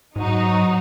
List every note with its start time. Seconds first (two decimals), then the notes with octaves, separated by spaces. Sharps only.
0.16 G#2 F#3 D#4 F#4